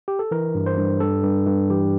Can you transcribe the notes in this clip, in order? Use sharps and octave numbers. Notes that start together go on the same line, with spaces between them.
G4
A4
E3 A#4
G2
C5
G2
G2 A4
G2
G2
E3 G4